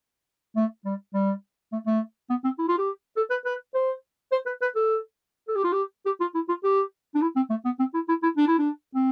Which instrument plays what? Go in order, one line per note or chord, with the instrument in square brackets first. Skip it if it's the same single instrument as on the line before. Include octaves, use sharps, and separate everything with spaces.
[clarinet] A3
G3
G3
A3
A3
B3
C4
E4
F4
G4
A4
B4
B4
C5
C5
B4
B4
A4
A4
G4
F4
G4
G4
F4
E4
F4
G4
D4
E4
C4
A3
B3
C4
E4
E4
E4
D4
E4
D4
C4